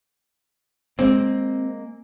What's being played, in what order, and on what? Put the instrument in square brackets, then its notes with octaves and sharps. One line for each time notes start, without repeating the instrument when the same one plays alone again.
[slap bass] G#3 A#3 [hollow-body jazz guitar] C4